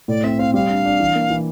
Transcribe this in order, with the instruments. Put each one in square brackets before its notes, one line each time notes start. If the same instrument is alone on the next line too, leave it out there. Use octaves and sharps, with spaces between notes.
[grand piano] A2 [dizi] D5
[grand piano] C4 [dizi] E5
[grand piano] C4 [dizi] F5
[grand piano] G3 [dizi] F5
[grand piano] D4
D4
E3
A#3
E3